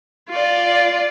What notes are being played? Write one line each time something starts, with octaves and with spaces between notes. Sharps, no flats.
F4 D5